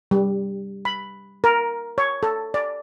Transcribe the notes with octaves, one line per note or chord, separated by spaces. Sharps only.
G3
B5
A#4
C#5
A4
D5